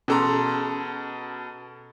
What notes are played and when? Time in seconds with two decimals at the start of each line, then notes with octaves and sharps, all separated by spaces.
0.08 B2 C#4 G#4 A4 A#5 C6